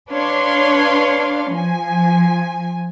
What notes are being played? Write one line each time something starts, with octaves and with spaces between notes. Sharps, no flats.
D4 B4 C#5 F5 C6
F3 G#5